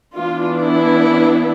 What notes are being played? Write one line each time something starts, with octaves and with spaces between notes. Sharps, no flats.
E3 B3 D4 F4
E4